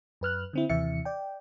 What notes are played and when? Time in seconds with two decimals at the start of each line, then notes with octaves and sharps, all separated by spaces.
0.21 F#2 B4 F6 F#6
0.53 D3 C4 E4
0.69 D#2 C3 E3 E5 C#7
1.05 D5 G5